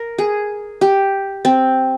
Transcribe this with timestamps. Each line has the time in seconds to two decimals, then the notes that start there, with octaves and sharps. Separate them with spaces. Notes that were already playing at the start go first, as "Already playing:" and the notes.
Already playing: A#4
0.18 G#4
0.81 G4
1.45 C4